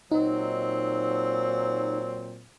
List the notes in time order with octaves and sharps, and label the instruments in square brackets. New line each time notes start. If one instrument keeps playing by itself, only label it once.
[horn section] A#2 F#3 C4 [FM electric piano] D#4